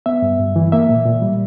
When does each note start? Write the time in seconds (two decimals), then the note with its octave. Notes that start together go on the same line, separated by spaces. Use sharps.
0.06 B3 E5
0.22 G2
0.39 G2
0.56 E3
0.72 A#3 E5
0.89 A#2
1.06 A#2
1.22 G3